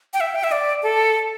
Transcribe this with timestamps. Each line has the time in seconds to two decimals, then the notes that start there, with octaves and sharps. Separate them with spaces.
0.14 G5
0.20 E5
0.35 G5
0.44 E5
0.52 D5
0.83 A4